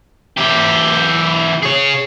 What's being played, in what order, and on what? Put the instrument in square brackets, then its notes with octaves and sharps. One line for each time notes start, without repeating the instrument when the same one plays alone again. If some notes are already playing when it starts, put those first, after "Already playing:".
[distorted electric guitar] E3 G4
G#4 C#5